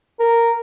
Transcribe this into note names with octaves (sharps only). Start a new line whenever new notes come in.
A#4